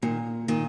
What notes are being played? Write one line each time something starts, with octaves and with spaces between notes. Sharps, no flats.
A#2 D#3
A#2 D#3